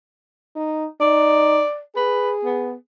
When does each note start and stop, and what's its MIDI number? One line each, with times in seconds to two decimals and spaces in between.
0.56 0.85 63
1.01 1.61 63
1.01 1.80 74
1.96 2.74 68
1.96 2.32 71
2.44 2.73 59